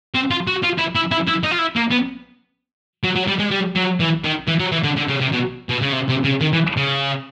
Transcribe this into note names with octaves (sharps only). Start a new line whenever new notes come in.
C4
F4
F#4
F4
E4
E4
E4
E4
D#4
F4
E4
A#3
B3
F#3
F#3
G3
G#3
G3
F#3
E3
D#3
E3
F#3
E3
D3
D3
C#3
C3
B2
B2
C#3
C3
C3
C#3
D#3
E3
C#3